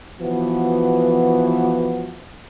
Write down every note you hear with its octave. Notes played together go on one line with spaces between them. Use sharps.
E3 F3 B3 F#4